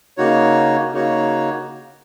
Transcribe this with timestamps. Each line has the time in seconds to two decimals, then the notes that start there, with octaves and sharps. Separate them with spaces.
0.17 C#3 A#3 D#4 F#4 C#5
0.91 C#3 A#3 D#4 F#4 C#5